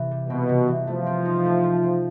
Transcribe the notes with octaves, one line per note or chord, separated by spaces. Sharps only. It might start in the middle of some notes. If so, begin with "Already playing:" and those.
Already playing: C3 E3
G3
B2 C4
C3
E3
F3 A3
C4
D#4
A3
A3
C4